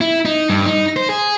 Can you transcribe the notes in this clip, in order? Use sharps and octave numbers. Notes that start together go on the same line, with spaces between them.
E4
D#4
G2
D#4
C5
G#4